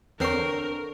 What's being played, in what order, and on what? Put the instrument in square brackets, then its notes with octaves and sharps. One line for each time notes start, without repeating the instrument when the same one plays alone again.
[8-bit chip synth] E2 C4 C7 [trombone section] D3 [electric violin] A#4 [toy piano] B4 C#5 C#6